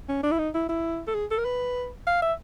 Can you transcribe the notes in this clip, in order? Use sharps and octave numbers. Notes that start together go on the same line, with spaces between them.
C#4
D4
E4
D#4
E4
E4
A4
G#4
A4
A#4
B4
F5
E5